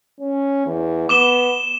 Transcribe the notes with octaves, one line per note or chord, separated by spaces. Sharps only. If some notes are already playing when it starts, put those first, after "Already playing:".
C#4
E2
B3 D6 E7 G7